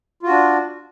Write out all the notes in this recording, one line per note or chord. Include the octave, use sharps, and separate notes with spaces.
D4 F4 F#4